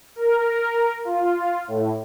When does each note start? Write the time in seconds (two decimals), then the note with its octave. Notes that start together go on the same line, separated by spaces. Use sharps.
0.16 A#4
1.05 F4
1.68 A2